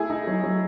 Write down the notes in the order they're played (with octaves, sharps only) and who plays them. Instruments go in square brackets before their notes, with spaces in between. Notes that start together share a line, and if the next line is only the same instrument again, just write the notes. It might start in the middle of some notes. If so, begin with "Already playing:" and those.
Already playing: [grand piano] A3 [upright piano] E4 G#4
[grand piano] D#4
F#3
F#3